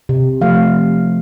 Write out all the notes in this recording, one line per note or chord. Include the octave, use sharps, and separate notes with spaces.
C3
F3 A3 C4 F5